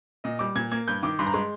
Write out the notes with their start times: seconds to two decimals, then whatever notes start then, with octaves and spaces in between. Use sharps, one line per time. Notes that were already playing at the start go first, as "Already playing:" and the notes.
0.24 A#2 D#5
0.39 G3 D6
0.55 A#2 G#6
0.72 A#3 G#6
0.88 G2 G6
1.03 D#3 D6
1.19 G2 C6
1.27 A#5
1.34 G#3 C6